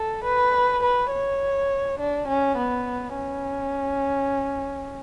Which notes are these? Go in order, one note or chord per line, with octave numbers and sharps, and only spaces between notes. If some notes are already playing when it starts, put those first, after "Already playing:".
Already playing: A4
B4
B4
C#5
D4
C#4
B3
C#4